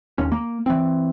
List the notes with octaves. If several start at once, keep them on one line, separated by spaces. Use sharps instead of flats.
D#2 C#4
A#3
E3 C4